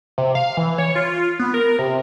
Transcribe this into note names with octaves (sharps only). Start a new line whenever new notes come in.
C3
F5
E3
C#5
F4
B3
A#4
C3